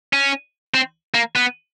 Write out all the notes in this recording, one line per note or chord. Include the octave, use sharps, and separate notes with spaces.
C#4
C4
A#3
B3